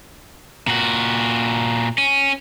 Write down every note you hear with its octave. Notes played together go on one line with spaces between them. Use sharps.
A#2 F#4
C#4